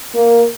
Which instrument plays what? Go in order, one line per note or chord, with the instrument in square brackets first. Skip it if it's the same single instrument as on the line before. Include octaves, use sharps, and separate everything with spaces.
[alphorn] A#3